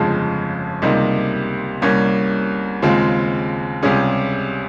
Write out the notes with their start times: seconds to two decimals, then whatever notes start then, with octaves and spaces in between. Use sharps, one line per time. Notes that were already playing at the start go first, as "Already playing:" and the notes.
Already playing: G1 F2 C#3 F3 G#3
0.82 C#2 C3 G3 A#3 D#4
1.82 C2 C3 G3 A#3 C#4
2.82 D#2 C#3 G#3 C4 F4
3.82 C#2 C3 G3 C#4 G#4